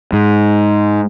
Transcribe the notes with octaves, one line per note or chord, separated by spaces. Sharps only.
G#2